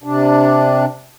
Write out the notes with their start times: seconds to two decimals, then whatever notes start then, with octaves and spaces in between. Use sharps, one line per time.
0.04 C3 D4